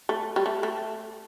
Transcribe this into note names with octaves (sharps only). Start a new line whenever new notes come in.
A3
G3
A3
A3